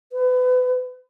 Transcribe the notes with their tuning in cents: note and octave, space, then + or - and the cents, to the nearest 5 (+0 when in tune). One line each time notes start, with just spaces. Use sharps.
B4 +30